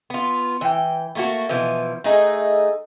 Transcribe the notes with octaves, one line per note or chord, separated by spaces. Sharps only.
B3 F4
E3 G5
A3 A#3 F#4
B2 E3 F3
A3 D#4 G#4